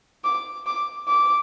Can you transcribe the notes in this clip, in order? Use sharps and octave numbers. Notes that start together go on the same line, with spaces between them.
D6
D6
D6